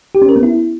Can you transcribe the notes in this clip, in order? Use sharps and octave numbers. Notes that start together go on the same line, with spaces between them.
G4
C#4
A#4
B3
E4